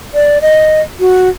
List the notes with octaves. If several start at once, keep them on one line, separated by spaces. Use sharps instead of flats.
D5
D#5
F#4